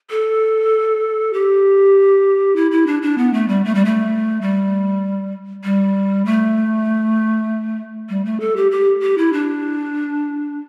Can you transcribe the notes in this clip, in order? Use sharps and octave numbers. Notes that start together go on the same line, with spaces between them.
A4
G4
E4
E4
D4
D4
B3
A3
G3
A3
G3
A3
G3
G3
A3
G3
A3
A4
G4
G4
G4
E4
D4